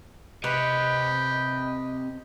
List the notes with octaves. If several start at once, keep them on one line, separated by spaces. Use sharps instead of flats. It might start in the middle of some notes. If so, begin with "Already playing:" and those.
C3 G4 B4 D#5